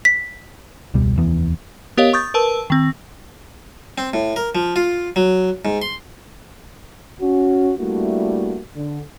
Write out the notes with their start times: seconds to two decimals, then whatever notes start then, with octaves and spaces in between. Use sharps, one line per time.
0.05 B6
0.94 E1 C#2 B2 G3
1.16 F1 D#2 E3 B3
1.97 B3 G4 A#4 C#5 D#5 F5
2.13 C#6 D#6 G6 A6
2.34 A#4 B4 A5 E6
2.70 D#3 C4
3.98 C4
4.13 A2
4.36 A#4
4.55 F3
4.76 F4
5.16 F#3
5.65 G#2
5.82 C6
7.21 C#4 F#4
7.78 G3 A3 A#3 D4 E4 F#4
8.75 D3